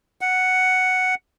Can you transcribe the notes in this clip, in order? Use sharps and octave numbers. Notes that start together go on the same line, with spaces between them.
F#5